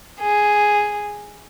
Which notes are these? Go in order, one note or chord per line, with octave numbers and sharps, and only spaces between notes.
G#4